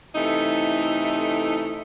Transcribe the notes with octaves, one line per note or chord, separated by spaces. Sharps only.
C3 E3 A3 D#4 E4 A4